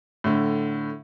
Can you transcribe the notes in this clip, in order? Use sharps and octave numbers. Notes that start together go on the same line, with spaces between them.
A2 D3